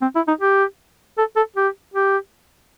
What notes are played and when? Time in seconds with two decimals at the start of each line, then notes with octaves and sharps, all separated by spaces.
0.02 C4
0.15 E4
0.28 D#4
0.41 G4
1.18 A4
1.36 A4
1.56 G4
1.94 G4